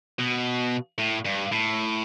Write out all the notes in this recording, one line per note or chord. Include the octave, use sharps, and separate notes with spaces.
B2
A2
G2
A2